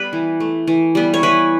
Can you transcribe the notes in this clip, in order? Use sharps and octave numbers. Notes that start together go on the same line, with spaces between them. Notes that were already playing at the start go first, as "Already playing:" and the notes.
Already playing: G3 B3 B4
E3
A3
E3
G3 B3
C#5
E3 B4